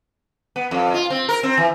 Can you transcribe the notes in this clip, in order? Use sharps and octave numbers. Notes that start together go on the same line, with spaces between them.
B3
F2
F4
C4
A#4
C4
E3